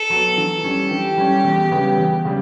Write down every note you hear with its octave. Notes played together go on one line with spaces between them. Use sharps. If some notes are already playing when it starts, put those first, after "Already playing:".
Already playing: A4
F#3 B3
E3
G3 C#4
E3 G4
G3 C#4
E2
C#3 G3 B3
E2
C#3 G3